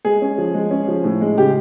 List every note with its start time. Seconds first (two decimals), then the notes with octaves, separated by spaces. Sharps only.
0.05 G#3 G#4
0.22 C#4
0.38 F3
0.54 G#3
0.71 C#4
0.88 F3
1.04 A2
1.21 G#3
1.37 C#3 G4